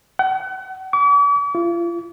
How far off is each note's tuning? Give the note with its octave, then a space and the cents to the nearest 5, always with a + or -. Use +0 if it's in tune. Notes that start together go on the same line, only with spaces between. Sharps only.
F#5 +40
D6 -45
F4 -35